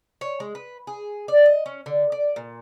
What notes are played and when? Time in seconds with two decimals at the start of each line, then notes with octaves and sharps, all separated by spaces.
0.21 C#5
0.40 G#3
0.55 B4
0.87 G#4
1.28 D5
1.46 D#5
1.66 C#4
1.86 D3
2.12 D5
2.36 A#2